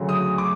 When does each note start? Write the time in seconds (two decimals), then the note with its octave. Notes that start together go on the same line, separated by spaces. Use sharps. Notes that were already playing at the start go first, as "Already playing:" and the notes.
Already playing: D2 C#3 F#3 A3
0.09 D#6
0.38 D6